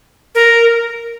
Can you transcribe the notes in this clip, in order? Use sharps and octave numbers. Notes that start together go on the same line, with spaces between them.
A#4